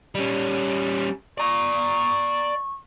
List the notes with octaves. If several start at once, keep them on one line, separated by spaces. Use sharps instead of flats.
G3 C#4
D5 A#5 C#6